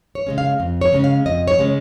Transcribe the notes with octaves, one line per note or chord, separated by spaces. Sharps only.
C#5
C#3 G#3 C#4
F5
F2
C#5
C#3 G#3 C#4
F5
F2 D#5
C#5
C#3 G#3 C#4